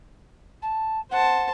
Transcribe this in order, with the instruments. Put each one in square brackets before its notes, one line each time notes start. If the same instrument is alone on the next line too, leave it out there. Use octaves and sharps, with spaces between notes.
[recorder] A5
[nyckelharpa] C5 A5 [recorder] F#5